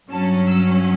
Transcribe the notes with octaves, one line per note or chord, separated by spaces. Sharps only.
G2 F#3 C#4 A5
E6